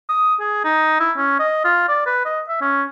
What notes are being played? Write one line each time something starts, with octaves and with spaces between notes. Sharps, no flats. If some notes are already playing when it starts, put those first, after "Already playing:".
D#6
G#4
D#4
E4
C#4
D#5
F4
D5
B4
D#5
E5
C#4